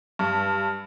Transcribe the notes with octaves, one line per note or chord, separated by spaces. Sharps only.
G2